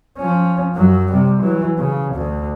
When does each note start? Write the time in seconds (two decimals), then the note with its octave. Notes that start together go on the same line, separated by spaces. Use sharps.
0.18 F3 C#4
0.75 F#2 F#3
1.11 C3 G3
1.42 E3 F#3
1.78 C#3
2.15 D2